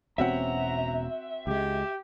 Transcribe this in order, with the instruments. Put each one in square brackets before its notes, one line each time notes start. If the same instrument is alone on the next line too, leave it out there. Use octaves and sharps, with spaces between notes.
[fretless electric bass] E1 B2 C#4 [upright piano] C4 F#4 F#5 [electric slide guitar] E5 [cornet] A#5
[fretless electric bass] C#2 G#3 [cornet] G4